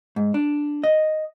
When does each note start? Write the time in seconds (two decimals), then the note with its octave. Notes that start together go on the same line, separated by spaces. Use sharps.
0.16 G#2
0.34 D4
0.84 D#5